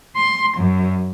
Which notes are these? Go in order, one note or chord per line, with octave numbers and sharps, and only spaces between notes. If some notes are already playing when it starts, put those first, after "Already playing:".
C6
F#2